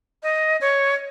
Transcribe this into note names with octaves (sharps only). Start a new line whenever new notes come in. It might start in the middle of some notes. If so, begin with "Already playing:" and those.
D#5
C#5